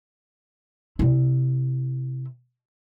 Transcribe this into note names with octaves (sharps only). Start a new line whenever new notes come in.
C3 E4